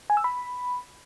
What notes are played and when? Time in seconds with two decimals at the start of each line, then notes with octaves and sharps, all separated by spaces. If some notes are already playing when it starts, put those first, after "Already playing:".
0.10 G#5
0.17 E6
0.24 B5